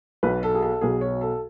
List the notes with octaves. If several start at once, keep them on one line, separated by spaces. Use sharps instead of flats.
B1 B2 B4
A4
G#4
A4
B1 B2 G#4
C#5
A4